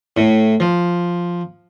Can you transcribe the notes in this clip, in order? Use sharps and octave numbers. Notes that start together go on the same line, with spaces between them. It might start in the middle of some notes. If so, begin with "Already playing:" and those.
A2
F3